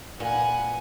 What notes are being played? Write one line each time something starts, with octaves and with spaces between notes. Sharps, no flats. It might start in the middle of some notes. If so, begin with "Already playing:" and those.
A#2 B4 F#5 G#5